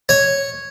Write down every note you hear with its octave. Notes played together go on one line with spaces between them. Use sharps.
C#5